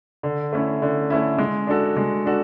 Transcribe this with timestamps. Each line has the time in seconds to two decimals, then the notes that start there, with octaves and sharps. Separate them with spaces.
0.23 D3
0.53 A3 C#4 E4
0.82 D3
1.10 A3 C#4 E4
1.38 G#3
1.67 D4 F#4 A4
1.97 G#3
2.26 D4 F#4 A4